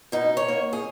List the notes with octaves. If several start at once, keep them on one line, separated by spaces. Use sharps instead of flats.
B2 D#4
C#5
A#3
G#4